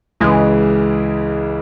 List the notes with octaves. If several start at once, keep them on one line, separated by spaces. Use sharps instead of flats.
C#2 C#3 E3 G#3